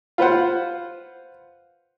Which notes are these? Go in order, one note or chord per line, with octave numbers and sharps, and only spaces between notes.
F4 B4 C5 F#5